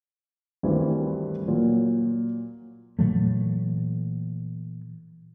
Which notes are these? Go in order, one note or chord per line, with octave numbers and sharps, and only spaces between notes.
D2 G2 D#3 E3 C4
A#2 F#3
A#2 E3 F#3 A3